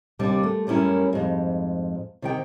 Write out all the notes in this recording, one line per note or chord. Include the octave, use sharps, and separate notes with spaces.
D#2 C3 G3 D4 D5
A3
F#2 G3 C#4 E4 A#4
F2 G#2
C3 D#3 G5